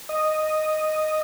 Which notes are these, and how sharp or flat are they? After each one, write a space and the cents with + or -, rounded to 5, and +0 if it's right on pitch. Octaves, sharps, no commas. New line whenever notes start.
D#5 -5